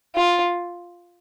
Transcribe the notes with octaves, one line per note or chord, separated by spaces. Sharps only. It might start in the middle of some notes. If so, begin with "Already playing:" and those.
F4